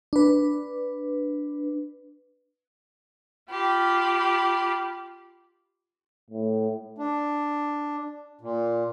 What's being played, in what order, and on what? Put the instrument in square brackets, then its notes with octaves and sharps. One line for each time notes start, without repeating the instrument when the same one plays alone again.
[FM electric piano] D4 B4
[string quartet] F4 G4 B5
[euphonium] A2
[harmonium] D4
A#2